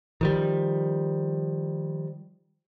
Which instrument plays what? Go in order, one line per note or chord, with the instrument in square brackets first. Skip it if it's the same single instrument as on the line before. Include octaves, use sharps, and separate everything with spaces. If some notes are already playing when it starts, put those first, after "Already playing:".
[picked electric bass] D#3 F3 G3